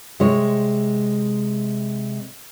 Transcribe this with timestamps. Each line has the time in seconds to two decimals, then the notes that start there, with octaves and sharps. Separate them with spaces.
0.20 C3 G#3 C#5